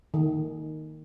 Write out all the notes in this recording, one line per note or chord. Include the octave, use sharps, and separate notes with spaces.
D#3